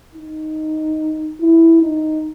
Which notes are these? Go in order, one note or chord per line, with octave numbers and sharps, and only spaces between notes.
D#4
E4
D#4